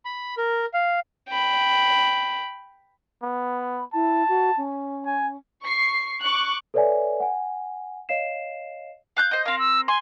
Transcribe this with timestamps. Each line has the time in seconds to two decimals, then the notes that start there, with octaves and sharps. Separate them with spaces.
0.05 B5
0.37 A#4
0.74 F5
1.29 G5 B5
3.22 B3
3.59 B5
3.93 E4 A5
4.28 F#4
4.57 C#4
5.06 G#5
5.64 C#6 C7
6.22 C#6 D6 F#6
6.74 A4 B4 C#5 D5 E5 G#5
7.20 F#5 G#5
8.09 C#5 D#5 F5 C7 E7
9.17 F5 F#6 G6
9.31 C5 D#5 G6
9.45 C4 A#4 F5
9.59 E6
9.88 G#5 C6